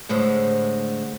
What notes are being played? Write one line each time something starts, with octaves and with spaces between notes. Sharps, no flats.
A2 D3 G#3 A3 C5